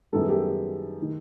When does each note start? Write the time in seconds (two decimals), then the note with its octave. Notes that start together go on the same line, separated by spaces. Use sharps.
0.12 F#2 D#3 G3 B3 E4 A4
0.21 G#4
0.29 G4 A4
1.02 D#3